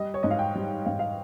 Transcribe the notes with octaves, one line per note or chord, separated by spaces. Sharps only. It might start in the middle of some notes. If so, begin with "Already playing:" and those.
Already playing: G3 D#5
C#5
G#2 D#5
F5
G5
G3
G#2 F5
F5